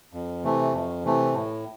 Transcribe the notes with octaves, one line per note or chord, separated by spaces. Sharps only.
F2
C3 E3 A3
F2
C3 E3 A3
A2